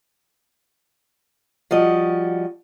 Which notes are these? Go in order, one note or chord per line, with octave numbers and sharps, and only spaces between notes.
F3 G3 F#4 D#5